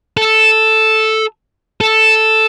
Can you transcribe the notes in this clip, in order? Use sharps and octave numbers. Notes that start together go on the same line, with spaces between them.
A4
A4